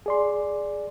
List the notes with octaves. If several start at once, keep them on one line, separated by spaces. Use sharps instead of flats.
G#4 D5 C6